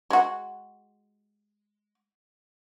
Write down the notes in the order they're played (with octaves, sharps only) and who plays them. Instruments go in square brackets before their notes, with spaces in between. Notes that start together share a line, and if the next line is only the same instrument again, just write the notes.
[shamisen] G#3 F#4